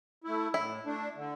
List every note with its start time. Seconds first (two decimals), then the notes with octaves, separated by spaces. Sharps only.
0.24 A3 E4
0.54 A2 E4
0.85 A3 D4
1.16 D3